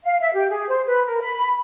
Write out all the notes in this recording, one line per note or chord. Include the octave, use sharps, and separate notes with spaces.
F5
E5
G4
G#4
C5
B4
A#4
B5